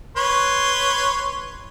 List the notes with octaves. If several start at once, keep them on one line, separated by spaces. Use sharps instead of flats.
B4 C#5 C6